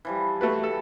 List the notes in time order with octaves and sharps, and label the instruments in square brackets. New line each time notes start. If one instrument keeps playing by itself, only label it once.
[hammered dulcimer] E3 F3 G3
[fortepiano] A3 F#4 B4
A4